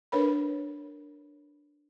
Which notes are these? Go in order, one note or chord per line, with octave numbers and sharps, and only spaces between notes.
D4 A#4 B4 C#5 B5